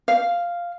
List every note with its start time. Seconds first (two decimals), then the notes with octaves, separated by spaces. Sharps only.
0.08 F5